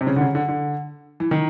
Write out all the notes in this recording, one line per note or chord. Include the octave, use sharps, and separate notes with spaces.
C3
C#3
D3
C#3
D3
D3
E3
D#3